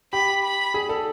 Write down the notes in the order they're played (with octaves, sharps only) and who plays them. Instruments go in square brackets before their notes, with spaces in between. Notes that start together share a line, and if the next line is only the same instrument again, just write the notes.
[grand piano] G4 [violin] B5
[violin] B5
[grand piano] G#4
A4